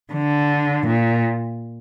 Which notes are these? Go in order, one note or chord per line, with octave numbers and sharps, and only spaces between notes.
D3
A#2